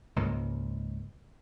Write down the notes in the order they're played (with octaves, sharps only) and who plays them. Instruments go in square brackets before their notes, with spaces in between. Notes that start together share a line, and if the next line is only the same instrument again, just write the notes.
[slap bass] C#2 G#2 A#3